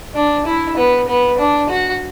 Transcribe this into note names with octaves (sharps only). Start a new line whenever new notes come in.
D4
E4
B3
B3
D4
F#4